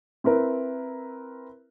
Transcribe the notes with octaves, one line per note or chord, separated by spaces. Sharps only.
C4 E4 A#4 B4